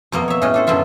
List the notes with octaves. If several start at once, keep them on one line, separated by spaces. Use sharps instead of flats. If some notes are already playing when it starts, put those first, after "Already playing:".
F2 B2 A#3 D#5
C#5 E5
A2 C#4 G#4 D#5
D4 A4 C5
F#2 B2 D3 F4 E5